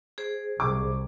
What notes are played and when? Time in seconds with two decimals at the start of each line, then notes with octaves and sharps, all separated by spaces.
0.18 G#4 C5
0.60 C2 D6